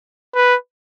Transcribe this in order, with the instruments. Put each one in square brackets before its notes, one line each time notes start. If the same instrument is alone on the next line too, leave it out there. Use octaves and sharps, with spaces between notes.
[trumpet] B4